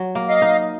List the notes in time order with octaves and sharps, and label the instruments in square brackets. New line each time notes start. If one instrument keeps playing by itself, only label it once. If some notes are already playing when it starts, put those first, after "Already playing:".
Already playing: [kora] F#3
A#3
[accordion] D#5 F5
[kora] D#4